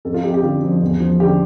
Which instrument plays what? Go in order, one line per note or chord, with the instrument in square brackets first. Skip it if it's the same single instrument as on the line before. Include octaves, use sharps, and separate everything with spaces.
[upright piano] F2 A4
F4
F2 G4
G4
D3 F4
F3
E2
F3
D3 G4